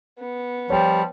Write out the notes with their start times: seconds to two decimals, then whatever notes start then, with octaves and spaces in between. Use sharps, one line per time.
0.19 B3
0.70 F3 G3 C#5 G5